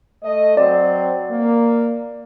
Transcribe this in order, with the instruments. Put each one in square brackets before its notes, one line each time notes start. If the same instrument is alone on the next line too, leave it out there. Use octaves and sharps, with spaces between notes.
[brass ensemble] A3 D#5
[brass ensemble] F#3 C4 [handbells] D5
[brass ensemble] A#3